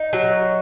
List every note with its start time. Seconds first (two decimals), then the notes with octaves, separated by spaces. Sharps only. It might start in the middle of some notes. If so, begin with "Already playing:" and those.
Already playing: D#4
0.13 F#3